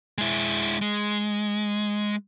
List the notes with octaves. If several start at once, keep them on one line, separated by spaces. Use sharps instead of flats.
G#3 E4
G#3